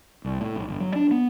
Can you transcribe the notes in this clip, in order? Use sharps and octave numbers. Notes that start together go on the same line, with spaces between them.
C2
A2
B1
G1
F#3
D4
B3